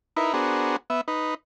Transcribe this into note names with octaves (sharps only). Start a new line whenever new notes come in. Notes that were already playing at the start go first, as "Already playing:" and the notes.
D#4 E4 A#4 B4
B3 D4 F#4 G#4 A#4 C5
B3 E5
D#4 B4